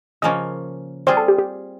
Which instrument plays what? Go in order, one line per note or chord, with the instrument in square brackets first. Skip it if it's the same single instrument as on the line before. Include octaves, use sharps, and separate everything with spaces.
[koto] C#3 F3 A#3 C#4 [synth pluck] D#5
[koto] G3 C4 F4 G#4 [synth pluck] C5
[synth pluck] A4
G4
G4